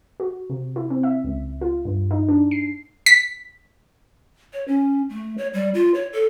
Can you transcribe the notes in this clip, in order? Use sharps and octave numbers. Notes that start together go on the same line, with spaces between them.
F#4
C3
E4
C4
E5
C#2
F4
G2
D#4
D4
C7
B6
C#5
C#4
A3
C#5
G3
F4
C#5
A4